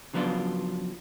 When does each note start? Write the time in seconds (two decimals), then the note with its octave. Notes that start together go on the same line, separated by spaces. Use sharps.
0.14 C#3 F3 F#3 B3 D4 F4